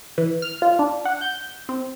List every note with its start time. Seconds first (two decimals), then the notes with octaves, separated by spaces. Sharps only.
0.18 E3
0.42 F6
0.62 F4
0.79 D4
1.05 F#5
1.21 G6
1.69 C4